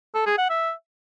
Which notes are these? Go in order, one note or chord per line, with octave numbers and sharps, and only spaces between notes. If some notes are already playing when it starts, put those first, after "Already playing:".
A4
G#4
F#5
E5